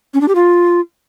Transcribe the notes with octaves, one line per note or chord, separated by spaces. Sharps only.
C#4
D4
G4
F4